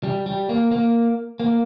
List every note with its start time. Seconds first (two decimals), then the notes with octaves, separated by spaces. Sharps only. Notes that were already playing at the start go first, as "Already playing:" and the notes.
0.03 G3
0.26 G3
0.49 A#3
0.72 A#3
1.40 A#3